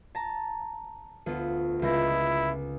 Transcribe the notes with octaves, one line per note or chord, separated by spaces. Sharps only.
A5 A#5
D2 B3 F4
C#2 E4 A#6